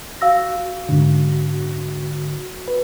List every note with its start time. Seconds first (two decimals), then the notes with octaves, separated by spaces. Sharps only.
0.21 F#4 F5 E6 A#6
0.65 F#4
0.89 G#2 D3
2.68 B4